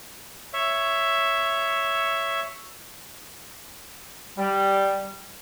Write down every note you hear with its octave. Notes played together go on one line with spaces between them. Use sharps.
C#5 E5
G3